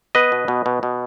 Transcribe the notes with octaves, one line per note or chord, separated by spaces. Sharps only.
B3 B4 D#5
B2
B2
B2
B2